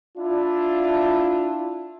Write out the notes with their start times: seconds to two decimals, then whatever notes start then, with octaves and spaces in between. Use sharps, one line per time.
0.17 D4 E4 F4